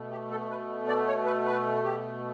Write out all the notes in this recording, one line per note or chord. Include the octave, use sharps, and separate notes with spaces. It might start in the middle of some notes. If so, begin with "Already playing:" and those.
Already playing: B2 A3
G4
A4
B4
D5
C#5
B4
B4
G4